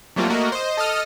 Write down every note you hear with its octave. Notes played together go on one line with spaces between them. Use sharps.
F#3 G3 A3 A#3 C4 F4
A3 A#3 F#4 A#4 D#5
C5 D#5
A4 D#5 D#6 F6